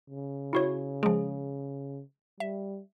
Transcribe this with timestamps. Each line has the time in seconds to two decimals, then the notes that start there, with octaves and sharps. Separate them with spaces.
0.10 C#3
0.53 E4 F#4 C#5
1.03 F3 G#3 G#4
2.40 G3 E5